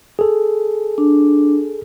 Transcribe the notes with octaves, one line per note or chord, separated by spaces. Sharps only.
G#4 A4
D4